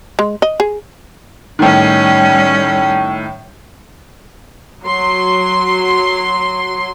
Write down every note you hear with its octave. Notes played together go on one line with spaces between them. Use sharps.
G#3
D#5
G#4
A2 D#3 G3 C#4
F#3 C6